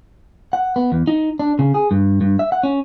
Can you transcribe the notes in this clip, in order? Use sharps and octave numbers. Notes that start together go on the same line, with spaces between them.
F#5
B3
E2
D#4
D4
C#3
G#4
G2
G2
E5
F#5
C#4